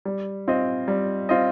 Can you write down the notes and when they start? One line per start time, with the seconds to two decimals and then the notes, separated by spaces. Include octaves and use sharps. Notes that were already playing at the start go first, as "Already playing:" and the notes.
0.05 G3
0.47 C4 F4 D#5
0.88 G3
1.29 C4 F4 D#5